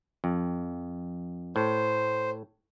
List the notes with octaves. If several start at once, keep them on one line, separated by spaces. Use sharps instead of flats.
F2
A2 C5